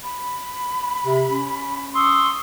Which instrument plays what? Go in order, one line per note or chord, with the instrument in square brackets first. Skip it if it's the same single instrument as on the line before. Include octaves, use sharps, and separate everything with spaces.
[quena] B5
[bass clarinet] C3
C#4
[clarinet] C6 [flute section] C#6 D#6 E6